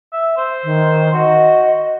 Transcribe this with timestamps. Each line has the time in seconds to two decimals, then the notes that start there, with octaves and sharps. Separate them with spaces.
0.12 E5
0.37 C5
0.64 D#3
1.13 F#4 D#5